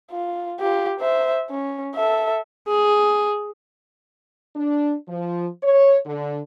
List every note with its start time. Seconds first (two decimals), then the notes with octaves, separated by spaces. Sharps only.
0.11 F4
0.60 F4 G4
1.00 C5 E5
1.50 C#4
1.96 A4 E5
2.68 G#4
4.56 D4
5.08 F3
5.63 C#5
6.06 D3